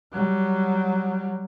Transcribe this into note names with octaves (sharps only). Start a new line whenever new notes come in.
F#3 G3